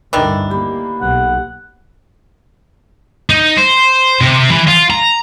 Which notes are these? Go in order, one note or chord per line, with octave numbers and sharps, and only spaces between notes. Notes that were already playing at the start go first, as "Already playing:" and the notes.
A1 D2 G2 D#3 E3 D4
A#3 G4 B5
B1 F#5
D#4
C5
C3
E3
F4
A#5